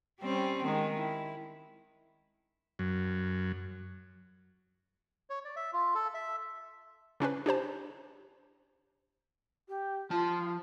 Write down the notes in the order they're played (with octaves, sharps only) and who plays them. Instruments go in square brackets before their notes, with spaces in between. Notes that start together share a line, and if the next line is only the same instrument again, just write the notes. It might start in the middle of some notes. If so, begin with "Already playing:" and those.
[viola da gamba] G3 C4 C#4
D#3 G#3
E4
[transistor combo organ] F#2
[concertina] C#5
D5
E5
F4
A4
E5
[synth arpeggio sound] C#3 C#4 D4 B4
D4 G4 C5 A5
[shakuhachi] G4
[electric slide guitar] F3 A5 [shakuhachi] F4